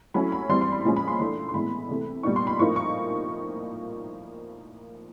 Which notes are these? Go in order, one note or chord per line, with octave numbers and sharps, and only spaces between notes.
F#3 A3 C#4 E4 B5
B5
E3 G3 C4 C6
C6
B5
A#2 F3 G#3 C#4
B5
C6
E3 A3 D4 C6
C6
A2 E3 G#3 B3 B5
C3 E3 A3
A#2 G3 B3 D#4 C#6
C6
B5
A2 F3 A#3 D#4 C#6
C#6